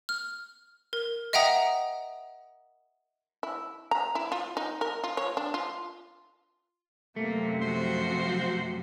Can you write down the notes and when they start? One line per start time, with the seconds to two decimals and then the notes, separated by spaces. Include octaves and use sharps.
0.09 F6
0.93 A#4
1.33 D#5 E5 F#5 G5 A#5 D#6
3.43 E4
3.91 A#5
4.15 E4
4.32 F4
4.57 D#4
4.81 A#4
5.04 F4
5.17 C#5
5.37 D4
5.54 F4
7.16 F#2 C3 A3 A#3
7.62 F3 F#4 C5